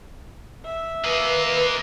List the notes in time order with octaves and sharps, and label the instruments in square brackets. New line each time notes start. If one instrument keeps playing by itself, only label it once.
[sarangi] E5
[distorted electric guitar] A#3 D#5 [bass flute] B4